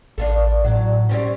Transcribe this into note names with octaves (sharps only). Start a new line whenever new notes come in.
A1 D4 F4 A4
A2 F#3
G3 C4 C#4